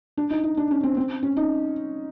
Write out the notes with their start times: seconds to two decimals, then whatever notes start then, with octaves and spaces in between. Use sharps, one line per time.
0.17 D4
0.30 D#4
0.44 D#4
0.57 D4
0.71 C#4
0.83 C4
0.97 C4
1.23 C#4
1.37 D#4